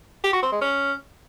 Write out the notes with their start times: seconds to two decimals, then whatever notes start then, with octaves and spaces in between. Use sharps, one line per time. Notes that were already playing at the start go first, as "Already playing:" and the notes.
0.24 G4
0.33 F#4
0.43 C4
0.52 G#3
0.61 C#4